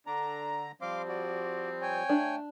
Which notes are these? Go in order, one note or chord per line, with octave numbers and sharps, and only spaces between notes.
D3 D4 A#5
F3 G3 C4 F5 C6 D6
F#4 D5
C#5 G5 G#5
A3 D4